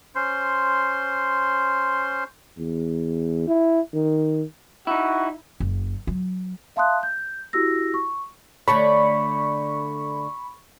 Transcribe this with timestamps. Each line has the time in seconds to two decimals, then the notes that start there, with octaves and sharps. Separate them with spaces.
0.15 C#4 C5 C6
2.59 E2
3.48 E4
3.94 D#3
4.87 D#4 E4 F#4
5.60 F#1
6.07 F#3
6.76 E5 F5 A5 C6 D#6 F#6
7.03 G6
7.53 E4 F#4 G4 E6 A#6
7.94 C#6
8.68 D3 A3 C#5 B5 C#6